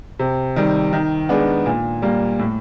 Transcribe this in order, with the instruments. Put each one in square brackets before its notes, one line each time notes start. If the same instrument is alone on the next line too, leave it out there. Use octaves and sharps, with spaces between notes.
[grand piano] C3
D#3 G3
D#3
G#3 B3 D4
A#2
G3 A#3
A2